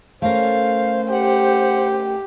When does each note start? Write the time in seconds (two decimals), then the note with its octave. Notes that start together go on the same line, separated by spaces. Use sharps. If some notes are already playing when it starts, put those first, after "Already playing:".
0.22 A3 C#4 A#4 C5 F5
1.11 G4 F#5